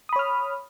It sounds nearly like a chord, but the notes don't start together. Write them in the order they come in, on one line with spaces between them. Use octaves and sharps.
D#6 B5 C#5 F6